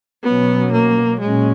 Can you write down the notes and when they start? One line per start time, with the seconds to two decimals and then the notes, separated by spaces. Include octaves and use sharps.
0.24 B2 F#3 B3 C#4
0.72 A#3
1.20 A#2 F#3 G#3 C#4